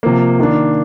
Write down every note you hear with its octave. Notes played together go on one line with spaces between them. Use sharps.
C3 F3 A#3
D#3 A#3 D4